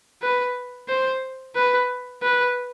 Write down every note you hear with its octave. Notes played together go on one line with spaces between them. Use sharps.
B4
C5
B4
B4